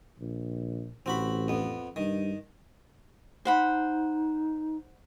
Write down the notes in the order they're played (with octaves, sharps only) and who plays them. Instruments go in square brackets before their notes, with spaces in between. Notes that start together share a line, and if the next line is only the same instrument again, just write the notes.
[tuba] A#1
[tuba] A1 [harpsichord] C4 F#4 B5
[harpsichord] F2 B3
[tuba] G2 [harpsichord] D#3
[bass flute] D#4 [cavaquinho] C5 F#5 B5